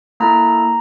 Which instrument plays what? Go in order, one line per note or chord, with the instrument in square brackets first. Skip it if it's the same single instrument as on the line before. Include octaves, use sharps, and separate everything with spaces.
[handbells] A#3 E4 A4 A#5